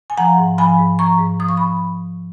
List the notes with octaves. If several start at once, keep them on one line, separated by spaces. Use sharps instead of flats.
G#5
F3 F#5 A#5
G#2
F3 G#5 B5
G#2
F3 A#5 C#6
G#2
F3 D#6
C#6
B5